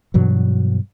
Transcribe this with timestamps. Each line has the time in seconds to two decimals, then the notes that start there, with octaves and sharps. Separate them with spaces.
0.14 G2 B2 E3 F#3